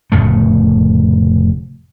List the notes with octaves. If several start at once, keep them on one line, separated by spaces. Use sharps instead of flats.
F1 A2 C#3 A3